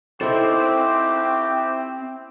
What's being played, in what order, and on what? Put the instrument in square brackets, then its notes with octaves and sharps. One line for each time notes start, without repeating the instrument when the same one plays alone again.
[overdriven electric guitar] C4 C5 [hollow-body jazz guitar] D#4 E4 A4 [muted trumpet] G4